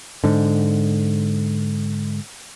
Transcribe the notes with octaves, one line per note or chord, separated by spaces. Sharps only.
G#2 D3